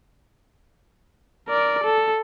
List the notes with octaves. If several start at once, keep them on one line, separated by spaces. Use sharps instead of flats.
A#4 D5
A4